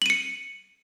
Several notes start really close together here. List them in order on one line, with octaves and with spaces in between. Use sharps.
F#7 D#7 C#7